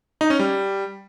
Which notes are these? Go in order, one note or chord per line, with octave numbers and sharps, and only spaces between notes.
D#4
C#4
G3